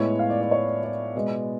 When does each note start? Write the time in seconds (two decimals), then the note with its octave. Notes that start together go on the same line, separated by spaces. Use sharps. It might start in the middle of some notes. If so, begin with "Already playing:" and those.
Already playing: A2 G#3 B3 C#5
0.19 F5
0.30 D5
0.41 D5
0.51 C#5
0.67 D5
0.84 D5
1.15 B2 G#3 B3